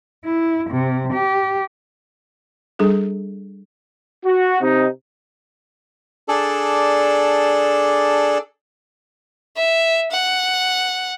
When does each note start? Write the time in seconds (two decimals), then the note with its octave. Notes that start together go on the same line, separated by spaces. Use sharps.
0.23 E4
0.69 C3
1.12 G4
2.79 G3 D4 G#4 A4
4.25 F#4
4.62 C3 C4 D#4
6.28 D4 G#4 A4 D5
9.56 E5
10.11 F#5